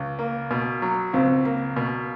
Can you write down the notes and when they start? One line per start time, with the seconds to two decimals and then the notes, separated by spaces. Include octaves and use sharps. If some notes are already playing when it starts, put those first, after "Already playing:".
Already playing: C#2
0.19 A#3
0.51 B2
0.82 F#3
1.13 C#2 C4
1.45 A#3
1.76 B2